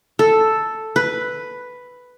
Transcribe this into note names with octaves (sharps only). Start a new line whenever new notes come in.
A4
B4